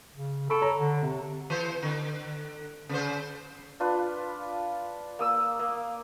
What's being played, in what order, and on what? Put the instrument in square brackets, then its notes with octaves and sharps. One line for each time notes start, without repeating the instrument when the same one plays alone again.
[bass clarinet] C#3
[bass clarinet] A4 [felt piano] B5 C#6 D7
[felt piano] C#5 A#5
[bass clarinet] D3
[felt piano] C3
[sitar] E3 C5
D3
C#3 C5
[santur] D4 F4 B4
A#3 D#6 E6
A#3